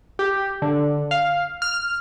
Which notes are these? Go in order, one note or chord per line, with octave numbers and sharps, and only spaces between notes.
G4
D3
F5
F6